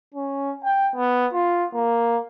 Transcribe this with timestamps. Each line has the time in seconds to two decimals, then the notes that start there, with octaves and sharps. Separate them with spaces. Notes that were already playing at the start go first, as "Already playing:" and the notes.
0.14 C#4
0.64 G5
0.96 B3
1.33 F4
1.74 A#3